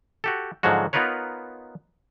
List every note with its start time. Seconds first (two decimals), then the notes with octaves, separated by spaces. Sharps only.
0.24 F#4 G4 A4
0.63 G#2 D3 F3 F#3 G#3 F#4
0.93 B3 D#4 F4 A#4 B4 C#5